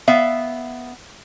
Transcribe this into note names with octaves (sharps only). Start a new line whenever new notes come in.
B3 E5 F5